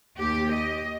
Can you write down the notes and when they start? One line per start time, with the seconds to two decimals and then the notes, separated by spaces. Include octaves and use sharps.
0.19 D#2 G4
0.53 D#5